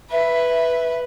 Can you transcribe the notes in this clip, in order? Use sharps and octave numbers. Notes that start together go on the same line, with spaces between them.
B4 E5